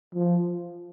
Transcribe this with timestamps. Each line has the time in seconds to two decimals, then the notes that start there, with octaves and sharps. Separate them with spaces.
0.15 F3